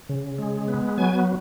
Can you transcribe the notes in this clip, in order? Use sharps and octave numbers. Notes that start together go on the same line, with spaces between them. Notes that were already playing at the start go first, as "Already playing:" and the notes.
C#3
G#3
B3
F#3 G#5